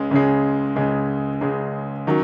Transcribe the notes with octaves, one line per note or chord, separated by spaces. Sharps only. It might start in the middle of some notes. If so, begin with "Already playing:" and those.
Already playing: C#2 C#3 G#3
C#2 C#3 G#3
C#2 C#3 G#3
C#2 C#3 G#3
D#3 F#3 C#4